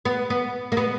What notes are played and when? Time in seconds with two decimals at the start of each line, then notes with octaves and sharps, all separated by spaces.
0.05 B3
0.30 B3
0.72 A#3
0.77 B3